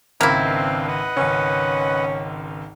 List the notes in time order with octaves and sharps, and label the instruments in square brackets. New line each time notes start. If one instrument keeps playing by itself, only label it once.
[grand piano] G#1 C#2 [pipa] A#3 E4 [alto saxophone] C4 [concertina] F#4
[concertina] D4 B4 F5
B4 D#5 F#5
[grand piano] G#1 C#2 [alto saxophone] C#4